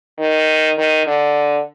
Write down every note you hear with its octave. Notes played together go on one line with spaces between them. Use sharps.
D#3
D#3
D3